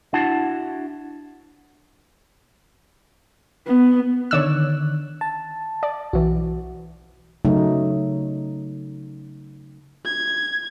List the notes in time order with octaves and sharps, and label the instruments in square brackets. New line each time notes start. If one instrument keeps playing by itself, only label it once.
[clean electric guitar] D4 E4 F#4 F#5 A5
[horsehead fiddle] B3
[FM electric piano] D3 D#3 F#6 [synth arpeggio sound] C#5 D5 E6
[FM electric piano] A5
[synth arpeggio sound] D5
[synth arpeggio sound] B1 E3 [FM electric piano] F#4
[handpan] C#3 F#3 A3 D#4
[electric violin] G#6